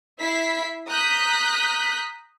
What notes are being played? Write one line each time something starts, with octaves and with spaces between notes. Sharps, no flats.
E4 E5 B5 B6 C7
A#5 D#6 F#6 G6 B6